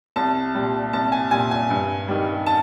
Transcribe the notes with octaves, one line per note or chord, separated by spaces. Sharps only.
C2 A5
A#2 G3
C2 A5
G#5
A#2 G3 G#5
G#5
G2
D#3 G3
A5